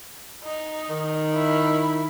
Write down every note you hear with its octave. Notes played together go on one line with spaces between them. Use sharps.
D#4
D#3
E4